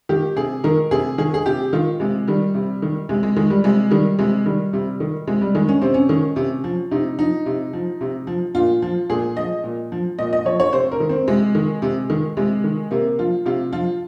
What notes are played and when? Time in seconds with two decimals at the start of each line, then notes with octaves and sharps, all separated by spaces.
0.09 D#3 G4
0.36 C3 G#4
0.64 D#3 A#4
0.91 C3 G#4
1.18 D#3 G#4
1.34 G#4
1.46 C3 G4
1.73 D#3 F4
2.00 C3 G#3
2.27 D#3 G3
2.55 C3
2.82 D#3
3.09 C3 G#3
3.23 G#3
3.36 D#3 G#3
3.50 G3
3.64 C3 G#3
3.91 D#3 G3
4.19 C3 G#3
4.45 D#3 G3
4.73 C3
5.00 D#3
5.27 C3 G#3
5.41 G3
5.55 D#3 G#3
5.69 C#4
5.82 C3 C4
5.94 C#4
6.09 D#3
6.36 C3
6.64 F3
6.91 C3 D#4
7.18 F3 D#4
7.46 C3
7.73 F3
8.01 C3
8.27 F3
8.55 A#2 F4
8.82 F3
9.10 A#2 G#4
9.37 F3 D#5
9.64 A#2
9.92 F3
10.19 A#2 D#5
10.33 D#5
10.45 F3 C#5
10.60 C#5
10.73 C3 C5
10.92 A#4
11.00 D#3
11.09 C4
11.28 C3 G#3
11.55 D#3
11.82 C3
12.10 D#3
12.37 C3 G#3
12.64 D#3
12.91 C3 A#3
13.19 F3 F4
13.46 C3 F4
13.73 F3 F4